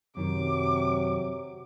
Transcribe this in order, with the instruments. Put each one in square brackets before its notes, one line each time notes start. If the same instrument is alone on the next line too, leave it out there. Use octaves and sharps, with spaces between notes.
[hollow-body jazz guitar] F#2 D#3 [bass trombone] C3 [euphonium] F#3 [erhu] D6